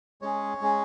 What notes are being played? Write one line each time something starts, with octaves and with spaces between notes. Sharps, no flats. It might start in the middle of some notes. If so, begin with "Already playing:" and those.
G#3 C#4 G#4 C#5
G#3 C#4 G#4